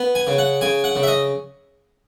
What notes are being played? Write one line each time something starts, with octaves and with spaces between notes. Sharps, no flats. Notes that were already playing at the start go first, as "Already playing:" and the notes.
Already playing: B3
G#5
C#3
F#5
C#3 G#5
F#5
C#3
E5
D#5